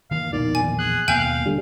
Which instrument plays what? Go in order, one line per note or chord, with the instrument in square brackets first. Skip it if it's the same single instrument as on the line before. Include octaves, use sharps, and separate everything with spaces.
[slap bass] D#3 E3 A#3 [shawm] F5
[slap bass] A#1 E2 B2 [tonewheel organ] D#3 [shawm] D5
[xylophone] G#5
[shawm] G#4 [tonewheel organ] F#6
[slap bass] D#2 B2 A#3 [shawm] F5 [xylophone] G5 G#5 G6
[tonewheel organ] D3 G3